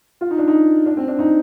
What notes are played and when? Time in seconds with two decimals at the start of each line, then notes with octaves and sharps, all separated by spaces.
0.21 F4
0.31 D#4
0.38 D4
0.48 D#4
0.86 D4
0.97 C4
1.08 D4
1.19 D#4